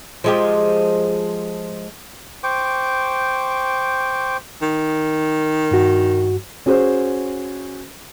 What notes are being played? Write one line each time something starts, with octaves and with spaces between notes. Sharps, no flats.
F3 G#3 G4
C5 G5 C#6 D6
D#3
G2 F#4
C#4 F#4 G#4 C5